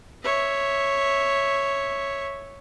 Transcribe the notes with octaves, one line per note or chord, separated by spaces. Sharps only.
C#5 E5